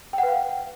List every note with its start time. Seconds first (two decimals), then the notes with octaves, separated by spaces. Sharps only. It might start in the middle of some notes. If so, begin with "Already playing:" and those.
0.13 G5
0.18 F#5
0.23 B4
0.28 F5